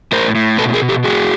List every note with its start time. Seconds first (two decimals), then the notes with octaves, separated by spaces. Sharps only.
0.12 A2 A#4 C5
0.35 A2
0.58 B2 A4 B4
0.74 G#4 A#4
0.82 B2
0.89 G4 A4
1.04 A2 F#4 G#4